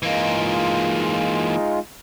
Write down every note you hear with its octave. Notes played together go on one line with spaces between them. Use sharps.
E3 G#3 A#3 D#4 F4